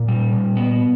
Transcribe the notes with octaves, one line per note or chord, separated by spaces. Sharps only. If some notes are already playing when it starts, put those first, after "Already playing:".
Already playing: A#2
G3
A#2
B3